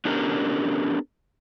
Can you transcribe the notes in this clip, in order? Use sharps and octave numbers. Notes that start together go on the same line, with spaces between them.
B3 C#4 D4 G4 A4 A#4